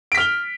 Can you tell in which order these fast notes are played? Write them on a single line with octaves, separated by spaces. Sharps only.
D7 B6 F6 G7